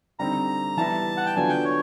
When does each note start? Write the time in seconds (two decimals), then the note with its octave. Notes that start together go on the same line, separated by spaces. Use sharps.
0.19 D3 G3 C4 D#4 A#5
0.77 E3 G3 B3 E4 A5
1.17 F#5
1.26 G5
1.36 D3 F#3 B3 D4 F4 G#5
1.49 G5
1.65 C#5